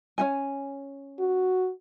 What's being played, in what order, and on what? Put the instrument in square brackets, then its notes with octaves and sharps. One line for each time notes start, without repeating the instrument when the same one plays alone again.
[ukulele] C#4 D#4 G#5
[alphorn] F#4